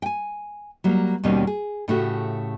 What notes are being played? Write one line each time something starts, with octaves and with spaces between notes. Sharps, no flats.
G5 G#5
F#3 G3 A#3
D#2 B2 D#3 G3 A#3 C#4
G#4
A2 C#3 A3 C#4 F#4 G4